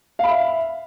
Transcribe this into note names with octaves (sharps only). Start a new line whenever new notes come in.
E5 F5 B5